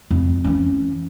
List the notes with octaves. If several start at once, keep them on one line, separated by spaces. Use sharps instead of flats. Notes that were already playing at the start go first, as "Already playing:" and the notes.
F2
E3 C#4